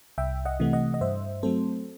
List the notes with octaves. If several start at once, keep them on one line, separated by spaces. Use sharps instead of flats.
C2 E5 G5
D#5 F#5
C3 E3 A3
D#5 F#5
D#5
G2 C5 E5
F#3 A3 C4 A4 C5